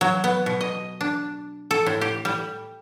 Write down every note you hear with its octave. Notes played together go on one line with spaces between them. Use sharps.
F#3
B3
B2
D#5
D4
A4
A2
G4
G3